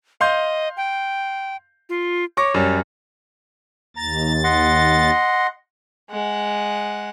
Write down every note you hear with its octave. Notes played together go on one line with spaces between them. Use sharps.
D#5 F5 C6 G6
G5
F4
C#5 C#6 D6 A#6
F#2 G3
D#2 A#5 A6
D#5 F#5 C6
G#3 F#5